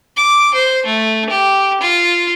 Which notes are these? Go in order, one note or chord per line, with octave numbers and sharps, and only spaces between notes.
D6
C5
A3
G4
F4